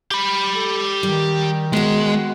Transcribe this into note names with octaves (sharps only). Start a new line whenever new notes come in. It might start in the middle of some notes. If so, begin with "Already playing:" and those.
G4 B5
A4
D#3 G3
G#3 B3 F#4